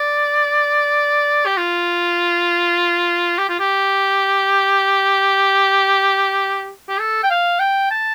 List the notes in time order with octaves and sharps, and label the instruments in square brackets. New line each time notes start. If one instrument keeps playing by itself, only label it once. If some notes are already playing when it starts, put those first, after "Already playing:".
Already playing: [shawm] D5
G4
F4
G4
F4
G4
G4
A4
G5
F5
G5
A5